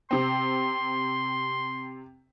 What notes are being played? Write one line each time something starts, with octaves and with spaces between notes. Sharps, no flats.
C3 C4 C6